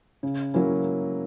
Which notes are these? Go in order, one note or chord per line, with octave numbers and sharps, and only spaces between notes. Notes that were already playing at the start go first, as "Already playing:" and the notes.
C#3
F#3 A#3 C#4 E4